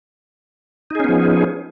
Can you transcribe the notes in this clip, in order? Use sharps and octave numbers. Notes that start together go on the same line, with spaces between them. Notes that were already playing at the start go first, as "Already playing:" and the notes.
F3 B3 C#4 D#4 G#4